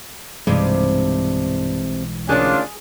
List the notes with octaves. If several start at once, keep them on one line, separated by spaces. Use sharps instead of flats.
B1 G2 C3 E3 G#3 D#4
D2 D#3 C#4 D4 F4 G#4